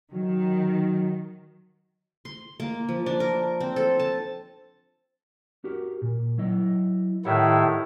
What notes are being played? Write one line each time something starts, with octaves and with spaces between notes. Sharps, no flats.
D#3 F#3
C6
A#3
F3
D4
A#4
C4
A4
A5
F#4 G4 A#4
A#2
F#3 E4 D#5
A2 D#3 E4 G4 C#5 F#5